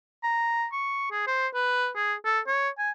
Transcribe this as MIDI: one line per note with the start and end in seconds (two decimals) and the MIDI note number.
0.24 0.66 82
0.72 1.06 85
1.11 1.23 68
1.27 1.48 72
1.54 1.89 71
1.96 2.14 68
2.25 2.40 69
2.47 2.69 73
2.78 2.91 80